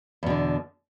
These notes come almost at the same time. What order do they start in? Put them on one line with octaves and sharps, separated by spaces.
E2 B2 D3